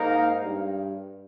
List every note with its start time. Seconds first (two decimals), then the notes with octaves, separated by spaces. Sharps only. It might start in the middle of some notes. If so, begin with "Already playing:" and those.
Already playing: G#2 A#3 D#4 A#4 F5
0.43 G2